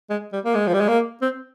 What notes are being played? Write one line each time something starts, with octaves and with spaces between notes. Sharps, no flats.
G#3
G3
A#3
G#3
F3
G3
G#3
A#3
C4